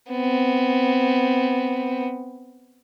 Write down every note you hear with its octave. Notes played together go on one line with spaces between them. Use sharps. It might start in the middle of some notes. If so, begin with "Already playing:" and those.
B3 C4